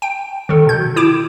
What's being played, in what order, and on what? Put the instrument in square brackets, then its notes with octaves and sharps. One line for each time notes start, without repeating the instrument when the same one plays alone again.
[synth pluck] G5 D7
D#3 A4
B2 G6
E4 D6 D7 E7